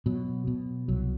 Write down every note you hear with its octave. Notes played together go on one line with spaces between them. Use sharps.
B2 F#3
B2
C2 F#3